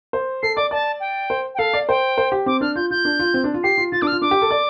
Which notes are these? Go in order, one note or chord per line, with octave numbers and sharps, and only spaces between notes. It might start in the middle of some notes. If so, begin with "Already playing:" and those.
C5
A4 C7
D5 D6
D5 A5
G5
C5
G5
A4 F5
D5
C5 G5
C5
G4
C4 D6
D4 F6
F4 G6
F4 G6
D4
F4
C4
D4
F4
G4 C7
F4
F4 A6
D4 D6
F6
F4
D4 D6
G4
A4
D5